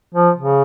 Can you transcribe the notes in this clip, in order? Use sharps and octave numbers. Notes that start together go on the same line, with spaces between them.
F3
C#3